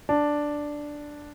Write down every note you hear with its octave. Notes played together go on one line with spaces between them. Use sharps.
D4